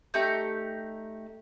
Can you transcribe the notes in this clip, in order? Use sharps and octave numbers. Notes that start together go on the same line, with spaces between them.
A3 D#4 G4 G6